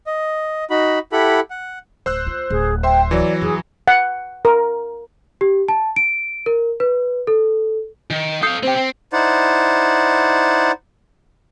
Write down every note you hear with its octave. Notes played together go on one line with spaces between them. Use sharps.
D#5
D#4 F#4 B5
E4 G4 A4 F#5 B5
F#5
D1 C5 E6 F#6
F4
D1 G#4
C5 E5 G5 C6
E3 F#3 D5
F2 G#4
F#5
A#4
G4
A5
D7
A#4
B4
A4
D#3
A4 F5 D#6 G6 C7
C4 G4 C5 G5
C4
D#4 E4 C5 D5 F#5